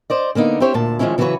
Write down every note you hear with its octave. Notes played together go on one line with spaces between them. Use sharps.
C5 D5 D#5
D3 A#3 B3 D#4
C4 E4 G4 C5 C#5
D2 A#2 A5
D#3 F3 F#3 G#3 C#4 E4
C#3 E3 F#3 F#4 B4 C#5